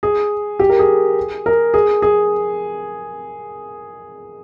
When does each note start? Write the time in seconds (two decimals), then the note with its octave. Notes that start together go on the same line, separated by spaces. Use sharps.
0.03 G#4
0.59 G4
0.69 A#4
0.79 G#4
1.46 A#4
1.74 G#4
2.02 G#4